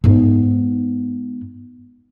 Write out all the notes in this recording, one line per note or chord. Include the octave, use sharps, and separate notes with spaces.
G#2 B3